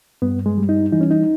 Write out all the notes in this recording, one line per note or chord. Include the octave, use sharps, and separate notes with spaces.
G2 B3
G#3
G3
D#4
E3 D#4
C#4
D#4